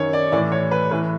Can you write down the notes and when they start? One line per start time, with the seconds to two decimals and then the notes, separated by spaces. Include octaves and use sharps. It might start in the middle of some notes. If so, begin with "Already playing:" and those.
Already playing: F#2 D#3 C#5
0.13 D5
0.32 A2 E3 D5
0.52 C#5
0.71 B4
0.91 A2 E3 B4